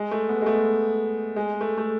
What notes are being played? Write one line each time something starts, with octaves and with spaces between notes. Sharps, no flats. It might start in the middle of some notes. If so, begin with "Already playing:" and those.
Already playing: G#3
A3
B3
G#3
A3
G#3
A3
A3